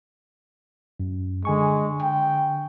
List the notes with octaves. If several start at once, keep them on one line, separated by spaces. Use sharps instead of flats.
F#2
D3 G#3 G#5 C#6
G5